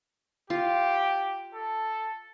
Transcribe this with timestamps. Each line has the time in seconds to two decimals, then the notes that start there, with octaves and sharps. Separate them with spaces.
0.50 F4 G4
1.54 A4